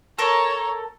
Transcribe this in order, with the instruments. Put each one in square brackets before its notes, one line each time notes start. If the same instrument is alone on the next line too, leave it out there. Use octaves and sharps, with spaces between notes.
[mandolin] A4 A#4 [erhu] C#5